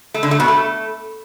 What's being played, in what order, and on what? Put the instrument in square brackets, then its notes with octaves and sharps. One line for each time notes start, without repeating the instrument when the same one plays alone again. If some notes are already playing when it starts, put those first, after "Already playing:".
[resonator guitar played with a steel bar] A3
D3
A3
B2
A3